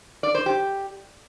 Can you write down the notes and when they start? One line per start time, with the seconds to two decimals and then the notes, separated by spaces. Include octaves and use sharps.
0.23 D5
0.35 C5
0.46 G4